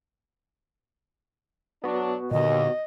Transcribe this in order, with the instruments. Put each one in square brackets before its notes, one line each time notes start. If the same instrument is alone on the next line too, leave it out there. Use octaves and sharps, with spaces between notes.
[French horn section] F#3 D4 [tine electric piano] B3 F#4
[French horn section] D#2 [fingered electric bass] A#2 D3 [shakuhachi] D#5